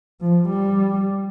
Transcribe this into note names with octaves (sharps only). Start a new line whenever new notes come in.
F3
G3